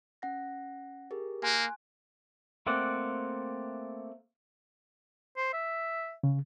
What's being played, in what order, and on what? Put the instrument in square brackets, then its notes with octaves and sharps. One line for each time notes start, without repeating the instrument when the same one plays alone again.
[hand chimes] C#4 F#5 A#6
G4 G#4 A#4
[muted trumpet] A#3 [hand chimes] G#5 C6 F#6
[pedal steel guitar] A3 A#3 C4 D5 F#5
[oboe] C5
E5
[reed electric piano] C#3